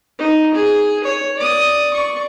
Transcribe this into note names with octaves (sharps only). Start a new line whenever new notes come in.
D#4
G#4
C#5
D5 D#6
D5 C#6